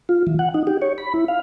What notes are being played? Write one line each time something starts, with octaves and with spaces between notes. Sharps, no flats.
F4
E3
F#5
D#4
G4
C#5
B5
E4
F5